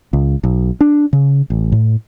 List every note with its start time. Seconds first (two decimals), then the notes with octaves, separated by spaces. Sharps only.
0.13 C#2
0.44 B1
0.81 D4
1.13 C#3
1.50 A1
1.72 A2